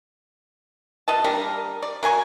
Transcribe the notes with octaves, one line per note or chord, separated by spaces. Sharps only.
B2 D#5 A5
G3 A#3 D4 A#4
D5
F#3 A#4 G#5 C#6